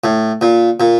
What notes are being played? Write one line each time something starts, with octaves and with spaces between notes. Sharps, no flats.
A2
A#2
A#2